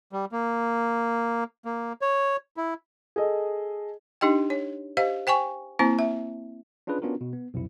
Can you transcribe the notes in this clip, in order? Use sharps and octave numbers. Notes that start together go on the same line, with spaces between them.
G3
A#3
A#3
C#5
E4
G#4 A4 D#5
D4 D#4 G4 D#5 G5
C#5
G4 C5 D#5 F5
C5 G5 G#5 C#6
A#3 C4 E4 C5 A5
E5
C#4 D4 F4 G#4 B4
B3 C#4 D4 F4 F#4 A#4
B2
B3
B1 F2 C3 E4